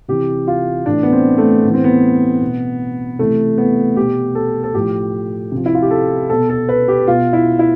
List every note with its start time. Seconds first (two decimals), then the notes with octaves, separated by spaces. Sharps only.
0.08 C3 E3 G4
0.47 F4
0.86 A2 E3 D4
1.03 B3
1.12 C4
1.38 A3
1.64 A2 E3 B3
1.74 C4
1.84 B3
2.41 B2
3.19 C3 E3 A3
3.58 B3
3.96 B2 G4
4.35 A4
4.63 A4
4.74 A2 F3 G4
5.52 C3 F3
5.66 E4
5.75 F4
5.82 G4
5.91 A4
6.30 B2 A4
6.50 A4
6.69 B4
6.88 G4
7.07 B2 F4
7.33 E4
7.59 E4